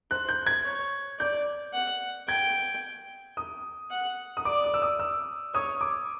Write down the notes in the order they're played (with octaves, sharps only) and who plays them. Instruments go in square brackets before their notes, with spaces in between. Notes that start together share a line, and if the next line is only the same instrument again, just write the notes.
[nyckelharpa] C5 [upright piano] F#6
[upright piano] G6
G#6
[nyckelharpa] C#5
[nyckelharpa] D5 [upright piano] G6
[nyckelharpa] F#5
[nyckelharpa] G5 [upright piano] G#6
[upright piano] D#6
[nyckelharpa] F#5
[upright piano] D#6
[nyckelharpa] D5 [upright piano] D6
[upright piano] D#6
E6
D#6
E6
[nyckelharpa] C#5 [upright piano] D#6
[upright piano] D6